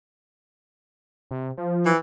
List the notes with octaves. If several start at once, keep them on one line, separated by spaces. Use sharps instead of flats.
C3
F3
E3